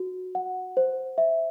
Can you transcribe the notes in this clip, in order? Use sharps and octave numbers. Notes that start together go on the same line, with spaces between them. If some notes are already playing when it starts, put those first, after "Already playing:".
Already playing: F#4
F#5
C5
E5